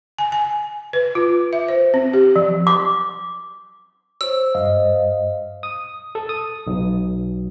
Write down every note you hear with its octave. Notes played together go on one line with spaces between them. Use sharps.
G#5
G#5
B4
F4
E5
C5
C4
G4
F3
D6
C5 C#5 E6
G2 D#5 F5
D#6
A4
D#6
B1